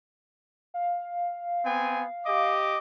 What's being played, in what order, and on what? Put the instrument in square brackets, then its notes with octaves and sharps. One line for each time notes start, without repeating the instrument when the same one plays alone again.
[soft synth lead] F5
[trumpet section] B3 C4 G#5
G4 D#5 D6